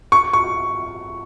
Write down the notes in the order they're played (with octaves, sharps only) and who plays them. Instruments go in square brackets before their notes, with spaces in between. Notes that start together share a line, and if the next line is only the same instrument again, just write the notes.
[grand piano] C#6
C#6